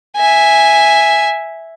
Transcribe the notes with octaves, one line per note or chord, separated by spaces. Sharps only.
E5 G#5